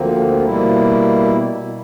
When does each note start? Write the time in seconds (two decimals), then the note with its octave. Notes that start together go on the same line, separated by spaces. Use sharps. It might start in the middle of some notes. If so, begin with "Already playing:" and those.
Already playing: D2 D3 F3 A#3 C4
0.36 F4
0.44 B2 G3 A#3 E4